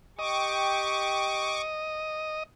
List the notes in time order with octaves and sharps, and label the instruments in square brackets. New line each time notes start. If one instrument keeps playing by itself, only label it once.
[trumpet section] G4 G5 [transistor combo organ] D#5 [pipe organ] C#6 D6